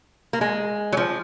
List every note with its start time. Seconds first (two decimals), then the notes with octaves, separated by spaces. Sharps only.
0.33 A#3
0.41 G#3
0.93 F#3
0.97 F3